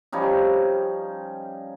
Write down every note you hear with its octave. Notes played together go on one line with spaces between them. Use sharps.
F3 G3 C#4 D#4